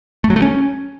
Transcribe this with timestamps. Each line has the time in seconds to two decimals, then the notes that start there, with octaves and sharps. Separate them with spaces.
0.24 A3
0.30 F#3
0.36 A3
0.42 C#4